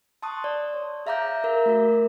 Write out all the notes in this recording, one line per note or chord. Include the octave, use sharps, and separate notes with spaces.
A5 C6 C#6 D#6 F#6
D5
C#5
G#4 E5 F5 A#5 D6 G6
A#4 E5
A3 F#4 A#4